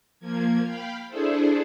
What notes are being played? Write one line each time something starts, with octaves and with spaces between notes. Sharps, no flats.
F3 A#3 G#6
F5 G5 B5
D4 E4 G#4 A4 C5